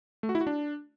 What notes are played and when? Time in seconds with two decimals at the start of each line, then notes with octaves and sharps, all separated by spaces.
0.23 A3
0.29 F#4
0.35 E4
0.41 F#4
0.47 D4